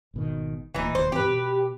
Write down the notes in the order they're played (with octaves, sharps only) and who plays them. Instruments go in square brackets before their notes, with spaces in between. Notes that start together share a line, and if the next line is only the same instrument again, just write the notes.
[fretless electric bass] G#1 B2 D#3
[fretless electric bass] D1 A#2 [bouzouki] E3 D#4
[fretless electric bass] E1 D#2 [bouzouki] C5
[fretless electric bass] G#2 E3 C4 [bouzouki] G4 B4
[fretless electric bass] B2